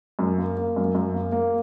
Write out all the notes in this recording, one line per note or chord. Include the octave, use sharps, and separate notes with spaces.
F#2
A#3
A#3
F#2
F#2
A#3
A#3